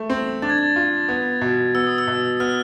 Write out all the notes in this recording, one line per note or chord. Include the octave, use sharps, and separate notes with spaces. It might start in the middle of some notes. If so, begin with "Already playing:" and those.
Already playing: A3
C4
D4 A6
G#6
A6
F4
B3
B2
B3 E6
D#6
E6
B2
B3 F6